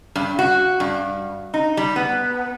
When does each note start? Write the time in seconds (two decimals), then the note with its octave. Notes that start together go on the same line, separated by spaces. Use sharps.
0.16 G2
0.39 F#4
0.80 G2
1.54 D#4
1.77 G3
1.96 B3